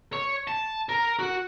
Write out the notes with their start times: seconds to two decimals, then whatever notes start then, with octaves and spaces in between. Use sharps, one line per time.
0.13 C#5
0.48 A5
0.89 A#4
1.19 F#4